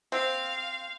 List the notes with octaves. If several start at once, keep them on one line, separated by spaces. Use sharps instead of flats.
C4 F5